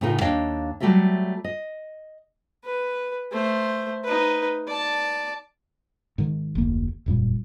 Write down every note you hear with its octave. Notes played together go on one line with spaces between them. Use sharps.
A2 C#3 D#4 F4 A#4
D#2 D4 C#5 D#5 F5 G5
F#3 G3 A3 F#4 A4 E5
D#5
B4
A3 C5
D#4 B4
D5 A5
G#2 D#3
F1 D2 A#3
E1 F#2 A#2 G3